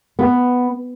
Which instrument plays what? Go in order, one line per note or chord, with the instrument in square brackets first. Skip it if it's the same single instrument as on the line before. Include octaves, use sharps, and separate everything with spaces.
[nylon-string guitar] B3